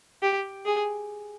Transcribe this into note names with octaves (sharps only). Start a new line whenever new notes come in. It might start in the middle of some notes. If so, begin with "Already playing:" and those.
G4
G#4